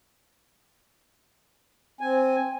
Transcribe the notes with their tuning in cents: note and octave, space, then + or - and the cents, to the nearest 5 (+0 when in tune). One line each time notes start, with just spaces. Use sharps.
C4 +0 G#5 +0